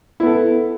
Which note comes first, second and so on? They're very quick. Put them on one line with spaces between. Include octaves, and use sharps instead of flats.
E4 B3 A4